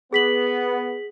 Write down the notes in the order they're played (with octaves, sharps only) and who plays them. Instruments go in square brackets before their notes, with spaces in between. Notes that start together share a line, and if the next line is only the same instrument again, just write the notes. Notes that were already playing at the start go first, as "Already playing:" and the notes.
[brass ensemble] B3 [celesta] G#4 B6 F#7